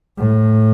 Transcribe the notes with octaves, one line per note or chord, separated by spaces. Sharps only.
A2